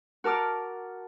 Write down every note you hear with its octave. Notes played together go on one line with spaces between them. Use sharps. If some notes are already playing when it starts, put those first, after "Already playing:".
F#4 A#4 A5 D6 F6